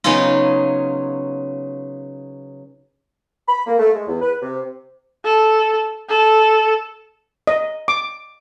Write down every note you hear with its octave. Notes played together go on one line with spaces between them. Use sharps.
C#3 F#3 B3 C#4 D#4 F4
B5
A#3
A3
G#3
E2
B4
C3
A4
A4
D#5
D6